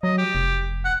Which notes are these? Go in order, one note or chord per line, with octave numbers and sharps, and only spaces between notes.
F#3 D#5
G4
F1
F#5